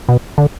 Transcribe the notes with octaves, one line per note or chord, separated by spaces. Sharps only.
B2
D3